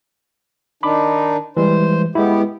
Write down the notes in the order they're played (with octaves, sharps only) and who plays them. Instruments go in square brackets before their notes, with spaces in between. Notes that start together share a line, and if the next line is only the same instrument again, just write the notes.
[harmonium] D#3 D4 D#4 [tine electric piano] B5 D6
[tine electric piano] E3 G3 G#3 [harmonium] C5
[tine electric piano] G#3 E4 [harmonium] B3 G4